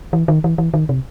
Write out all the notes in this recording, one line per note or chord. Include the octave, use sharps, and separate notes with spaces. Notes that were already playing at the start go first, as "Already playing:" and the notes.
E3
D#3
E3
E3
D#3
C3